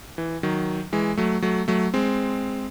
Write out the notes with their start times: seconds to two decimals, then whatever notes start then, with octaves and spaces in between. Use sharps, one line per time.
0.18 E3
0.43 D#3 F#3
0.93 E3 G#3
1.17 F#3 A3
1.42 F#3 A3
1.68 F#3 A3
1.94 G#3 C4